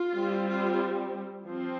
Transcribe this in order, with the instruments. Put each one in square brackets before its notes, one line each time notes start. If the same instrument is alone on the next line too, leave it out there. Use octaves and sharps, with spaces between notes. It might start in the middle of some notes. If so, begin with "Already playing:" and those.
Already playing: [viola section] F4
G3 C4
F4
F3 C4